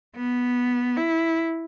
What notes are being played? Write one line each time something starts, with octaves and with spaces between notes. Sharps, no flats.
B3
E4